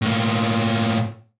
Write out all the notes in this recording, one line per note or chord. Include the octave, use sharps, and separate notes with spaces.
A2 A#3